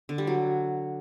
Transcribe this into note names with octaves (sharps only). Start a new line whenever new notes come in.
D3
G3
F#3